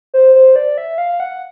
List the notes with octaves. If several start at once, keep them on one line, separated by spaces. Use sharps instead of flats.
C5
C5
D5
E5
F5
F#5